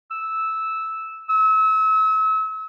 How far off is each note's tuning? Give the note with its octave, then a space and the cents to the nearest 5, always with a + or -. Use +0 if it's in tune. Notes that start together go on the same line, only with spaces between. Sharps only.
E6 -10
E6 -35